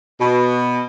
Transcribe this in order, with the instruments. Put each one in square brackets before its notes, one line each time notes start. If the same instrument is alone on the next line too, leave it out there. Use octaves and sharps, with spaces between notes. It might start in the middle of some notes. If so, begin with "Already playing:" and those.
[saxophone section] B2